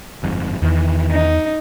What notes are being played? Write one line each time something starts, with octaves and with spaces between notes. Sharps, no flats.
G1 F2 G#2
E2 D#3 E3
D#4